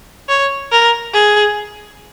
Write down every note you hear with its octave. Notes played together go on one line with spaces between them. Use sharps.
C#5
A#4
G#4